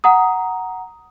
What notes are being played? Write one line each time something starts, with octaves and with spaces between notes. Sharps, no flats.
F#5 A#5 D#6